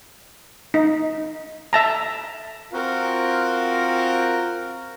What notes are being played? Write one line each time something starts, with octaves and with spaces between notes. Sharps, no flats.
D#4
E5 A5 A#5
C4 F4 F#4 A#4